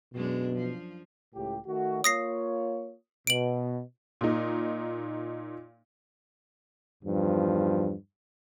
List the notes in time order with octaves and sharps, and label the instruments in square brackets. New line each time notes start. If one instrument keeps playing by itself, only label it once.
[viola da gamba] F#2 G#3 D4 [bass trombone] B2
[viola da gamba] F3
[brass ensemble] C#2 A2 G4
D#3 A3 F#4
[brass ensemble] A#3 F4 C#5 [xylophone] D#6 A#6 C7
[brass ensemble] B2 [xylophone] D7 F#7
[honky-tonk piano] A#2 D#4
[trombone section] E2 G2 D#3 F3